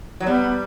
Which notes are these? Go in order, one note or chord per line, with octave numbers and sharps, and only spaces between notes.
F#3
G3 B3